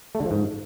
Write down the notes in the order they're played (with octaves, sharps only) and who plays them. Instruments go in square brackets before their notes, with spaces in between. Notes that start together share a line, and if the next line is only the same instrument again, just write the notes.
[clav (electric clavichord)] A3
D3
F3
G#2